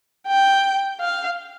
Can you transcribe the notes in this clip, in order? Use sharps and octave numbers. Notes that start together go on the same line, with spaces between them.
G5
F5